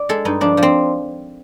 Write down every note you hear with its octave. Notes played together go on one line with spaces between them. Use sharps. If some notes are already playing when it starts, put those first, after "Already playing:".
Already playing: D5
G#3 A4
G2 D#4
F3 D4
F3
C4